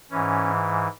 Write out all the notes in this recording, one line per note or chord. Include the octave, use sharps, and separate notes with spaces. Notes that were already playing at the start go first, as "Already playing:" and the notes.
G#2 E3 C#4